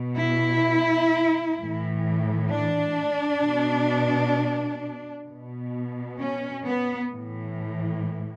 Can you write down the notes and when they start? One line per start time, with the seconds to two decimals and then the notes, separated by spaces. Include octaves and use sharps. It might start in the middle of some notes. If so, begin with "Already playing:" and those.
Already playing: B2
0.17 E4
1.57 A2 E3
2.50 D4
3.41 B2
5.27 B2
6.19 C#4
6.65 B3
7.11 A2 E3